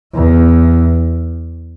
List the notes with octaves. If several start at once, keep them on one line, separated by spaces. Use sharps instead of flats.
E2